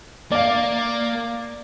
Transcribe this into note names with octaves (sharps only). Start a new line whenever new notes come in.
A#3 D5 F5